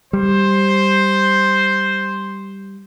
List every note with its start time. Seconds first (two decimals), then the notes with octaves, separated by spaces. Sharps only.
0.13 G3 C5